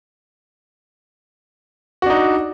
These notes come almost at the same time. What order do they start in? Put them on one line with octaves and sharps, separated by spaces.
F#4 D4 D#4